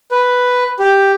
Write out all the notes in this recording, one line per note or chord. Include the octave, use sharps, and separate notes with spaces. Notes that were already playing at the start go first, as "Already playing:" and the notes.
B4
G4